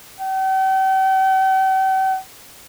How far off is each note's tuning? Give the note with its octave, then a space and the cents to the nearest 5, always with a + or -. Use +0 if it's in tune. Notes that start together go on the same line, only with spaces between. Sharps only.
G5 -45